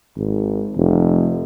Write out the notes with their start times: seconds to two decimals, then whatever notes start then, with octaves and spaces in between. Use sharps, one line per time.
0.16 G#1
0.76 F1